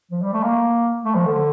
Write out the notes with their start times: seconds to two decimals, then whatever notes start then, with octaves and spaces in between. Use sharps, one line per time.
0.11 F3
0.22 G3
0.33 A3
0.43 A#3
1.05 A3
1.15 F3
1.26 D3